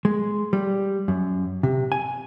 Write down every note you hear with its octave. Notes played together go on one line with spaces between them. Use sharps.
G#3
G3
F#2
C3
G#5